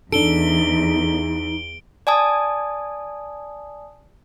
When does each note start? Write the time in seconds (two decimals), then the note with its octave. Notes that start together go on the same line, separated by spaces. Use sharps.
0.12 E2 D4 D#4 A4 D7 G7
2.07 D5 G#5 A5 D#6